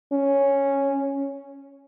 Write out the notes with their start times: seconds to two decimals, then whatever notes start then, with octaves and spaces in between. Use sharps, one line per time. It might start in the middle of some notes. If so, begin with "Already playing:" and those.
0.12 C#4